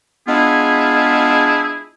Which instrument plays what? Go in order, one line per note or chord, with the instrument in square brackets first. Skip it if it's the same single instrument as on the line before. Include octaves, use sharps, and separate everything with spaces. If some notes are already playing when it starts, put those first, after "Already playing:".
[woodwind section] G#3 B3 D4 E4 F4 G#4